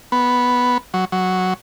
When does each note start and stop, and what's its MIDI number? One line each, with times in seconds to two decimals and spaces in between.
0.12 0.78 59
0.94 1.05 54
1.12 1.54 54